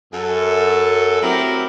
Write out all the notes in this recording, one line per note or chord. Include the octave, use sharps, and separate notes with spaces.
F#2 A4
F#3 A3 C4 E4 G4 A#4